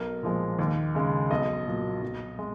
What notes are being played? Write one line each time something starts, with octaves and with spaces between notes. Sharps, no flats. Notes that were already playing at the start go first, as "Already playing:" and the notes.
Already playing: B1 A#4
A#2 F3 G#3
D#2
C#3 G#3
B1 D#5
A#2 F#3
B1
G#3